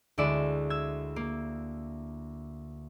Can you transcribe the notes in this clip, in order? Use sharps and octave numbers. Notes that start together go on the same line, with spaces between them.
D2 G#3 E4 D5 E7
E6 G#6
A#3